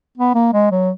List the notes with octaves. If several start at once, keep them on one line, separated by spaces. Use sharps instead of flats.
B3
A#3
G#3
F#3